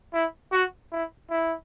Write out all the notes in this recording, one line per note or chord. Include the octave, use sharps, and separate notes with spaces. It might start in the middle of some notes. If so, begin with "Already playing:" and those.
E4
F#4
E4
E4